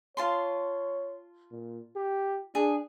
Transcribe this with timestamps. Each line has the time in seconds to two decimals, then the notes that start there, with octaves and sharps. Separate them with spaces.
0.17 F4 C#5 A5 C6
1.51 A#2
1.96 G4
2.55 D4 G#4